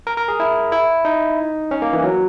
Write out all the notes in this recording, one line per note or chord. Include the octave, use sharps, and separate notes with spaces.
A#4
A#4
G#4
E4
E4
D#4
C#4
A#3
E3
F#3